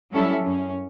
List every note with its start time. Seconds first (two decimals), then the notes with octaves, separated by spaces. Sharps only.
0.11 F#3 G3 C#4 E4 A4
0.43 F#2 C#4